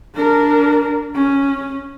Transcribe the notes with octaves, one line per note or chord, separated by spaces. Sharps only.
D4 A#4
C#4